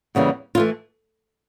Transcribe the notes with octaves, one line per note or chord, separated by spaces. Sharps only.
E2 C#3 E3 G3 A#3
F4
E3 A3